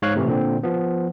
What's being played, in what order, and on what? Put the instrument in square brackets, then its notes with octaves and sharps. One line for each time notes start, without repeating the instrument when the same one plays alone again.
[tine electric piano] G#2 C#5 F5 F#6
A2 C3 E3
A#2 D3 C4
F3 B3